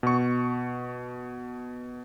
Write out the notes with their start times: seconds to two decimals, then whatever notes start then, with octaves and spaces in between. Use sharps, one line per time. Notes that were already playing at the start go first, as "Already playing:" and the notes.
0.03 B2 C#6